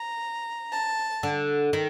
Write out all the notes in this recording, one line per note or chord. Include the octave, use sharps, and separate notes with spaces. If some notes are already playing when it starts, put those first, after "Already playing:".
Already playing: A#5
A5
D3
D#3